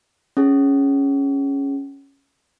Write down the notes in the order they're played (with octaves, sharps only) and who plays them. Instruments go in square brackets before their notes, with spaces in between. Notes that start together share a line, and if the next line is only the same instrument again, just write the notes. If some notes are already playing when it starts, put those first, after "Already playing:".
[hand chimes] C#4 G#4